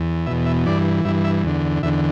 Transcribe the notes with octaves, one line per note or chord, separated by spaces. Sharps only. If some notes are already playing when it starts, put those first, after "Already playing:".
Already playing: E2
E2 B2 E5
E5
G2 E3 D5
G2 E3 E5
E5
E2 D3
E2 D3 E5